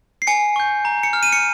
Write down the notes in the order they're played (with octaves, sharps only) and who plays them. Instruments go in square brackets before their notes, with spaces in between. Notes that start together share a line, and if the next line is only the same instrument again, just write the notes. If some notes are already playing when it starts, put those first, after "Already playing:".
[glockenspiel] C7
G#5 C#7
C#6 G6
A#5
C#7
F6
D#7
C#7